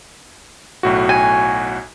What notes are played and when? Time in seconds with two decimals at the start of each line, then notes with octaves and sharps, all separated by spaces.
0.83 B1 A2 F#4
1.09 G#5